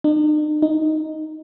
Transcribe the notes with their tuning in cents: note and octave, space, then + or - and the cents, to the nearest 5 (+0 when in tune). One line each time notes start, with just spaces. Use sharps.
D#4 -45
D#4 +0